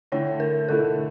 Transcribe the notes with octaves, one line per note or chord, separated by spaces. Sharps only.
D3 A3 E4 C#5
A#4
D3 A3 E4 A4